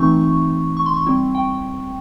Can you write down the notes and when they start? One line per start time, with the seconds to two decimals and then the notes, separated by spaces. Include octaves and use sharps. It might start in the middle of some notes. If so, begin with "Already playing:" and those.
Already playing: E3 A3 C4 D#4 C#6
0.77 C#6
0.86 C6
0.94 C#6
1.06 G3 C4 E4
1.35 G5